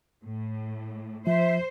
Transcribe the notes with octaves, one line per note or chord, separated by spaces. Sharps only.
A2
F3 C5 E5